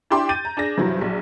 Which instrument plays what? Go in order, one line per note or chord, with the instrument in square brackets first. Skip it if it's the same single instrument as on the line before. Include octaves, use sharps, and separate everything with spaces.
[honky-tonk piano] D4 E4 G4 G5 C6 D6
G6 A6 D#7
A#5
D4 G#4 A#6
G2 C3 E3 F#3
A#1 F#3